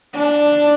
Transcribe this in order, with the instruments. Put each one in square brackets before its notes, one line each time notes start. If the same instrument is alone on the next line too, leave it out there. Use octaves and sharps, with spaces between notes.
[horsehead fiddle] D4